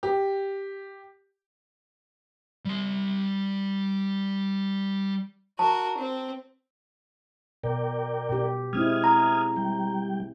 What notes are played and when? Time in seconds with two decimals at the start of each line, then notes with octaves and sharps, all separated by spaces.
0.03 G4
2.65 G3 C6
5.59 F#4 A#4 A5
5.98 C4
7.64 B2 A#4 D5 G5
8.29 B2 G4
8.73 G#3 C4 E4 D#6 F6 G#6
9.04 A#5
9.56 G3 G5